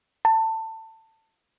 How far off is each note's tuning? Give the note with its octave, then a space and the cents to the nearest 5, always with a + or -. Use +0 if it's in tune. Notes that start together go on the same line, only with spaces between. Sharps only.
A5 +20